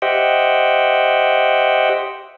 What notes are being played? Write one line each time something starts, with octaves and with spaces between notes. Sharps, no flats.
G4 C5 D#5 E5 F#5 G5